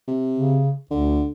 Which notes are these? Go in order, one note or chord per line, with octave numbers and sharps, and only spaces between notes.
C3
C#3
D2 D3